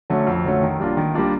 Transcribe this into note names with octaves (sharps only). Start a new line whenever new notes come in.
D3 F#3 A3 C#4
F2
D3 F#3 A3 C#4
D#3
G3 A#3 D4 F4
D#3
G3 A#3 D4 F4